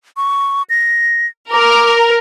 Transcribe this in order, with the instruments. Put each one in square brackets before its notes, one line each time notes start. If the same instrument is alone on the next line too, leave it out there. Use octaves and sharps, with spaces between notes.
[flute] C#6
A#6
[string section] A#4 [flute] D6